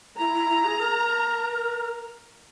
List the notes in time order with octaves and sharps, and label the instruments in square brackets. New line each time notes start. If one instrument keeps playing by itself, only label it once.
[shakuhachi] E4 [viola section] A#5
[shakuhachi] E4
E4
G#4
A#4